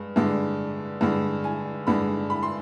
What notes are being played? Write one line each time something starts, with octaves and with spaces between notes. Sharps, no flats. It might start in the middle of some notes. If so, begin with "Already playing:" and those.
Already playing: G2 G#3
G2 D3 G#3
G2 D3 G#3
G#5
G2 D3 G#3 B5
B5
C6